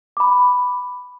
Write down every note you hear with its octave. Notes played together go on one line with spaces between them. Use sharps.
B5 D6